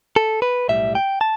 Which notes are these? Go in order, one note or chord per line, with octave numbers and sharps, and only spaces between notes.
A4
B4
B1 A2 G3 E5
G5
A5